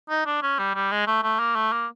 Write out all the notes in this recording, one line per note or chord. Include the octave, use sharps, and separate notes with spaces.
D#4
D4
C#4
G3
G3
G#3
A3
A3
A#3
A3
A#3